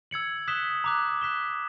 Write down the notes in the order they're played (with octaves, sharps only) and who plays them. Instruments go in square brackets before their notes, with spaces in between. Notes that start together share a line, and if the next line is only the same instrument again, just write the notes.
[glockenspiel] E6 G#6 C#7 F#7
D#6 F#6 B6 E7 G7
A#5 D6 F#6
F#6 B6 E7 G7